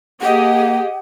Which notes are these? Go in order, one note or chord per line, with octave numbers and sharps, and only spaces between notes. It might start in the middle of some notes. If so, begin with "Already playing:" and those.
A#3 G4 G#4 D#5 F#5